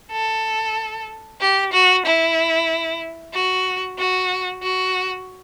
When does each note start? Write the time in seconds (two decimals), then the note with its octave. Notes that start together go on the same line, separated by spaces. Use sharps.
0.12 A4
1.41 G4
1.73 F#4
2.05 E4
3.34 F#4
3.99 F#4
4.63 F#4